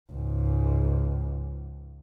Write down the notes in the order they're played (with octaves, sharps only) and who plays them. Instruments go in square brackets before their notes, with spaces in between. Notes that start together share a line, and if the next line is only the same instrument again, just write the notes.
[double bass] C#2 G#2